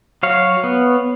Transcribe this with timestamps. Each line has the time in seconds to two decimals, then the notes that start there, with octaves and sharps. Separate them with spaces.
0.23 F#3 C#5 F5
0.64 B3